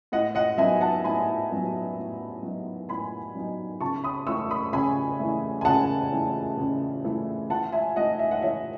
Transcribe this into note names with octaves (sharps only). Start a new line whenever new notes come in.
A2 D#5 F#5
D#5 F#5
F#3 B3 D#4 E5 G#5
F#5 A5
A2 G#5 B5
F#3 B3 D#4
A2
F#3 B3 D#4
A2 G#5 B5
F#3 B3 D#4
C#3 A5 C#6
B5 D#6
E3 A3 C#6 E6
B5 D#6
C#3 G#5 B5
E3 A3
G#5
C#3 F#5 A5
E3 A3
C#3
E3 A3
E3 F#5 A5
E5 G#5
A3 D#4 D#5 F#5
E5
F#5
E3 C#5 E5